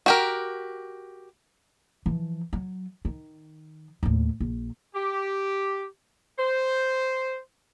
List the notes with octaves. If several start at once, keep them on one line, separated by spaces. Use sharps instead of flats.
F#4 G4 A#4
E3 F3
F#3
D#3
D#2 A2
A#1
G4
C5